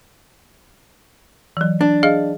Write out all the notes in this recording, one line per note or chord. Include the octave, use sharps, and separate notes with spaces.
E3 F#3
D4
G#4 D#5 F5